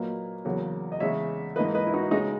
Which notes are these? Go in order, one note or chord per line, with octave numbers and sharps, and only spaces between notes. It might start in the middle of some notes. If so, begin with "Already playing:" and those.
Already playing: A#2 F#3 A#3 B4 D#5
E2 C#3 F#3 A#3
D#5
E2 C#3 G#3 C#5 E5
G#2 E3 A#3 B4 D#5
B4 D#5
E4
D#4 F#4
C#3 G#3 D#4 F#4